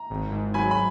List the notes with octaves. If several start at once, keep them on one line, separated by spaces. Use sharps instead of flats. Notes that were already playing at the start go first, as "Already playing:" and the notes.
Already playing: A#5
G#1
G#2
F#3 G#5 B5
B5